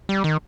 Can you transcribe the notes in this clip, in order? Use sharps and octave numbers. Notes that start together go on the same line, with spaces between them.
G3
D#3